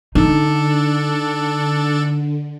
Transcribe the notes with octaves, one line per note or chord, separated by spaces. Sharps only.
D3 D4 D#4 A4